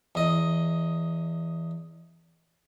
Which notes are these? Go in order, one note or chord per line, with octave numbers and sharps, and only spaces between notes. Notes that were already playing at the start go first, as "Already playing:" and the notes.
E2 D#5